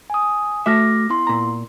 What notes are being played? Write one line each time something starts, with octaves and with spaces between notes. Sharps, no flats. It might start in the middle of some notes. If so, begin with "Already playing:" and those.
G#5 D#6
A3 F#4 E5 D6 F6 A#6
B3 E4 C6
A#2 A#5